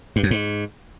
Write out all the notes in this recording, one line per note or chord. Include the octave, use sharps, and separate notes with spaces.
G2
F#2
G#2